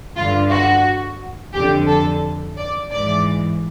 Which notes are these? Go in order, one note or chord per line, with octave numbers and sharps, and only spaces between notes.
G2 D3 F4
F#4
F2 D3 G4
A4
D5
G#2 E3 D5